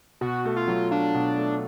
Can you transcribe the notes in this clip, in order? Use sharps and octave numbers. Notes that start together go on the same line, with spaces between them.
B2 F#4
A3
F4
F#3
D4 F4
B2
A3